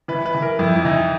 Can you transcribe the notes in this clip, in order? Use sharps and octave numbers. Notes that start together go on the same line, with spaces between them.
E3 B4
B4
E3
A#4
F2 E4
E4
E3 D#4